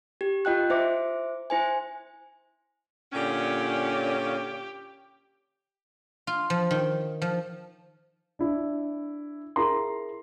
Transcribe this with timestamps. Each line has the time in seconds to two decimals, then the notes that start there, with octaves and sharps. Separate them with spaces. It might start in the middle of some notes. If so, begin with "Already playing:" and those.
0.21 G4
0.45 F4 D#5 G5 F#6
0.70 E4 C5 E5 D6
1.50 E4 C5 G#5
3.12 A#2 D3 C#4 G4
6.27 F4
6.50 F3
6.71 D#3
7.22 F3
8.39 D4 E4
9.56 E4 G#4 A#4 A#5 C6